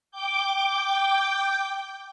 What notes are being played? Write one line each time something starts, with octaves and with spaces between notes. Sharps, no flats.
G5 D6 G6